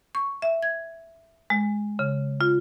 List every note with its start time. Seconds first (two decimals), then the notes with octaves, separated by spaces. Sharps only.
0.15 C#6
0.42 E5
0.63 G#6
1.50 G#3
1.99 C#3
2.41 F4